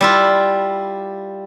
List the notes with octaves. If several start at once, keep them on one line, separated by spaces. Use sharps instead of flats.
G3 E4 F4